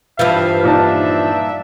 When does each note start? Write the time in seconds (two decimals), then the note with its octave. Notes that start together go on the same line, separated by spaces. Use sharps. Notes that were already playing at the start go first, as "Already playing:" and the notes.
0.19 G2 E3 F3 E5 F5
0.63 A#2 D4 D#4 A5